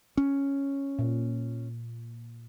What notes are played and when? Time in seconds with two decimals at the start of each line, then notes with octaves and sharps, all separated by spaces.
0.17 C#4
0.99 A#2